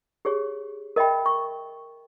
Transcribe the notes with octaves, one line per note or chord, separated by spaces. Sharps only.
G4 G#4 C#5
A#4 D#5 E5 G5 B5
C#6